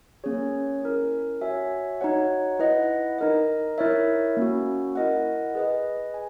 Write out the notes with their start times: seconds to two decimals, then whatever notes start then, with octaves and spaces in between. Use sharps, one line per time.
0.24 A#3 C#4 G#4 C#5
0.82 C#4 E4 A#4
1.41 F#4 C#5 E5 G#5
2.01 D#4 F#4 C#5 F#5
2.59 E4 B4 D#5 F#5
3.19 D#4 A#4 D#5
3.78 E4 A#4 C#5 E5
4.37 A#3 C#4 F#4
4.95 E4 A#4 D#5 F#5
5.55 G#4 B4 D#5
6.14 G#5